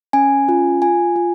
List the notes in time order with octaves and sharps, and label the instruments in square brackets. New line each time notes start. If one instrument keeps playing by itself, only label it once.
[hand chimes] C#4 G#5
F4
F4 G#5
F4